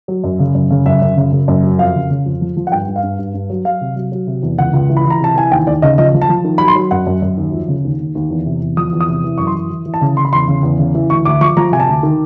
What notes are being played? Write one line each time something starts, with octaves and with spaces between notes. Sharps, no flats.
F#3
F#2
C#3
F#2
C#3
F#2 E5
F#2
C#3
C#3
F#2
F#3
F2 F5
C#3
C#3
F2
F3
F3
F#5
G2 G5
G2
F5
G2
G2
G2
F#3
F#3 F5
C3
F#3
F#3
C3
E2
C#2 F#5
C#2
E3
B5
E3
A#5
C3 A5
E3 G#5
D#2 G5
D#2 D5
C#3 D#5
F3 D#5
F3
A5
F3
D#3
F#3 B5
C6
F#3
F#2 F#5
F#2
F#2
D#2
F3
C#3
D#2
D#2
D#2
E2
C3
E2
F3 D#6
E2
D#6
C3
E3
F#2 C#6
C6
E3
E3
E3
A5
C#3
C#3 C6
B5
E2 C6
C#3
E2
C#3
E3
D2 C#6
D2 D6
F3 C#6
F3 A#5
C3 G#5
A5
D2
D#3